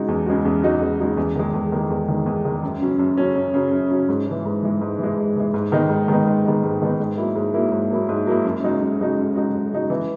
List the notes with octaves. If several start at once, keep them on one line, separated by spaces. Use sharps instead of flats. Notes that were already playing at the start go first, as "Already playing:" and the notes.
Already playing: C#3 G#3 D#4 F#4
E2
C#3 G#3 D#4 F#4
E2
C#3 G#3 D#4 F#4
E2
C#3 G#3 D#4 F#4
E2
D#3 G#3
E2
D#3 G#3
E2
D#3 G#3
E2
D#3 G#3
F#2
C#3 F#3 C#4
F#2
C#3 F#3 C#4
F#2
C#3 F#3 C#4
F#2
C#3 F#3 C#4
G#2
E3 G#3
G#2
E3 G#3
G#2
E3 G#3
G#2
E3 G#3
G#2
D#3 G#3 B3 D#4
G#2
D#3 G#3 B3 D#4
G#2
D#3 G#3 B3 D#4
G#2
D#3 G#3 B3 D#4
G#2
F#3 A#3 E4
G#2
F#3 A#3 E4
G#2
F#3 A#3 E4
G#2
F#3 A#3 E4
F#2
C#3 G#3 D#4 F#4
F#2
C#3 G#3 D#4 F#4
F#2
C#3 G#3 D#4 F#4
F#2
C#3 G#3 D#4 F#4
E3